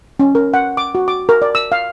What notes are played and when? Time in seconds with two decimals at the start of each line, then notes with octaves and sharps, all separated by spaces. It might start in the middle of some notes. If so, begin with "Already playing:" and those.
0.20 C#4
0.35 A#4
0.54 F#5
0.77 D6
0.95 F#4
1.08 D6
1.29 A#4
1.42 D5
1.55 E6
1.72 F5